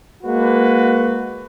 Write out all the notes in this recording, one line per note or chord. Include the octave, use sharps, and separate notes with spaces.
G#3 A#3 F#4 B4